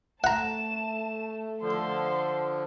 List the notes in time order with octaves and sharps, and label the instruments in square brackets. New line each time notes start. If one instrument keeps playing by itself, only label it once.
[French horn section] A3 [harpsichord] F#5 A#5 [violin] A5 E7
[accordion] D3 F3 [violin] A4 C6